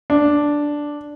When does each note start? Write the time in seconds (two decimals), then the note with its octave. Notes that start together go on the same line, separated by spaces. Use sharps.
0.10 D4